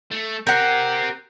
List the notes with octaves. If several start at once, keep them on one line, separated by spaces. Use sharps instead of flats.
A3
C4 G4 A#4 F#5 F#6 G6